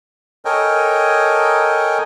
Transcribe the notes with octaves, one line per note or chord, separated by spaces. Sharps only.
A4 A#4 C#5 D#5 G5 G#5